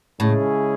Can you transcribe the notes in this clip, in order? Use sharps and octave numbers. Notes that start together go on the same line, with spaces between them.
A2 C#3 G#3 C#4 E4 G#4